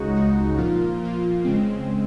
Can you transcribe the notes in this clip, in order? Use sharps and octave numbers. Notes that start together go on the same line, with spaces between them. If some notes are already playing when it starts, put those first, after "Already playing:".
Already playing: C#2 C#3 G#3 D#4 F#4
C#2 C#3 G#3 D#4 F#4
A#2 F3 A#3 F4
A#2 F3 A#3 F4
C#3 G#3 C4